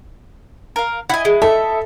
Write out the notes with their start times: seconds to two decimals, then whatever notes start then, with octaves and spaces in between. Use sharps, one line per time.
0.76 A#4 F5
1.10 E4 D#5 F#5 G#5
1.25 G#3
1.42 A4 E5